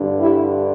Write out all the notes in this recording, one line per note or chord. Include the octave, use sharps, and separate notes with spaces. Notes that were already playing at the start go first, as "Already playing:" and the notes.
Already playing: G2 D3
E4 G4